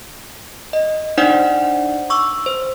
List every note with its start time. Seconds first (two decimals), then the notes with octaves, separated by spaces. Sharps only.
0.73 D#5
1.18 D4 D#4 C5 D5 F#5
2.10 C#6 D6 E6
2.46 C5